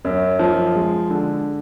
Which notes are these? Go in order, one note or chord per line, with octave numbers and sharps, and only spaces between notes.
F#2
F3
G#3
D3